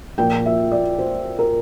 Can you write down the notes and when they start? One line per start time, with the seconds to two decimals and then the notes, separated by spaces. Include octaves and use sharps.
0.18 A#2 F3 A#3 G5
0.46 E5
0.72 D5
0.99 C5
1.39 A#4